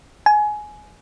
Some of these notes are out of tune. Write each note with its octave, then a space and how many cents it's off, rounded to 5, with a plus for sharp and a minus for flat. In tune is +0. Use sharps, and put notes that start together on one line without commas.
G#5 +15